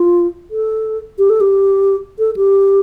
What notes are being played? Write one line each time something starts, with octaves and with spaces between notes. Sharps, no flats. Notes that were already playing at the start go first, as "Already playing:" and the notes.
Already playing: F4
A4
G4
A4
G4
A4
G4